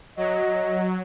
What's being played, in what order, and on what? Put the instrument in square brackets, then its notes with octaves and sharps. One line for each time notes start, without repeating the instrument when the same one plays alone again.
[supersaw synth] F#3 [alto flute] D#5